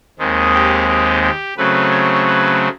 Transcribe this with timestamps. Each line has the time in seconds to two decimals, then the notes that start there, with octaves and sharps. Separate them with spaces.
0.19 D#2 D#3 G#3 C4
0.54 G4
0.88 G4
1.22 G4
1.57 C#3 F#3 A3 C4 B4
1.92 C#5
2.27 B4